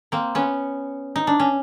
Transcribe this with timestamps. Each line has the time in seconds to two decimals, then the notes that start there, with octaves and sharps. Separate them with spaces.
0.12 A#3 C4
0.35 B3 C#4
1.16 D#4
1.27 D4
1.40 C#4